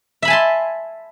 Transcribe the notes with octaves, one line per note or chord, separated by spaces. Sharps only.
E5 G#5 A5 B5 C6